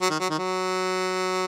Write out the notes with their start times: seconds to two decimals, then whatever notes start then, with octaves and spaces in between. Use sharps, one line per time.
0.01 F#3
0.10 D#3
0.20 F#3
0.30 D#3
0.38 F#3